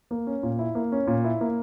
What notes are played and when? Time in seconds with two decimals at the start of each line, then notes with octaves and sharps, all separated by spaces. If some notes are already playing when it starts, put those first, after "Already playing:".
0.11 A#3
0.27 C#4
0.43 A#2
0.59 E4
0.75 A#3
0.92 C#4
1.07 A#2
1.24 E4
1.41 A#3